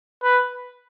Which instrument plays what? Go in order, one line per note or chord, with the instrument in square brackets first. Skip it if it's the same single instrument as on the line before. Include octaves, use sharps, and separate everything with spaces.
[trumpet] B4